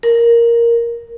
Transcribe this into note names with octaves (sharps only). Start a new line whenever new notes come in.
A#4